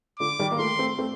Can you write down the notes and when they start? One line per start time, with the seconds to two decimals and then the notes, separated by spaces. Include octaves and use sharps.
0.19 D3 F3 D6
0.39 D#3 G3
0.51 A#3
0.59 F3 A3 C6
0.79 A3 C4
0.98 A3 C4